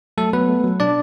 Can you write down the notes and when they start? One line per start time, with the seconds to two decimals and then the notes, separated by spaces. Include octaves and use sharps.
0.18 F#3 A3 A4
0.33 F#3 B3 B4
0.49 A3
0.64 F#3
0.80 B2 D4 D5